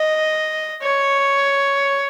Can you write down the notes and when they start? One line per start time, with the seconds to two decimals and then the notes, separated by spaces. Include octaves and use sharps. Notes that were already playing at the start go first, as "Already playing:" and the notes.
Already playing: D#5
0.83 C#5